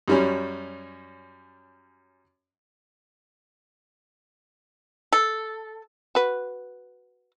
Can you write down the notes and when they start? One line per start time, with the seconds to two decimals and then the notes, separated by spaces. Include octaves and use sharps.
0.08 F#2 G3 C#4
5.13 A4
6.15 F#4 B4